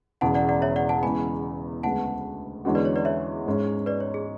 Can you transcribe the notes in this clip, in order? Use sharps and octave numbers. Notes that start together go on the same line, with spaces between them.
E1 E2 C#3 F#5 A5
D5 F#5
D5 F#5
C#5 E5
D5 F#5
F#5 A5
E2 C#3 G#3 B3 G#5 B5
D2 C#3 G#3 B3 F#5 A5
E2 D3 G#3 C#4 F#4
B4 D5
C#5
B4 D5
C#5 E5
G#2 G#3 C#4
B4 D5
C#5
G#4